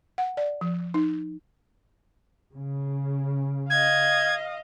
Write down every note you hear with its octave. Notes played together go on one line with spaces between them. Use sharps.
F#5
D5
F3
D#4
C#3
D#5 F5 G#6